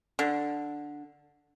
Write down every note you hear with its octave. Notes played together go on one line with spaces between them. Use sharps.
D3